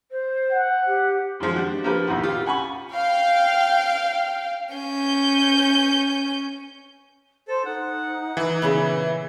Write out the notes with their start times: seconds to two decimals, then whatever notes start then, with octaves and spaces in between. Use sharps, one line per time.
0.11 C5
0.51 F#5
0.87 G4
1.40 F#2 D#3 F3 G#3
1.56 D4 F#4 G4 F#5
1.84 F3 A#3 D4 G4 A#4 B4
2.07 B1 F2 A2 D#3 F#5 C6
2.24 F4 G4
2.46 F#5 G#5 B5 C#6
2.94 F5 G5
4.75 C#4 G6
7.48 A4 C5
7.65 D#4 F#5
8.37 E3
8.62 A#2 C#3 B3 E4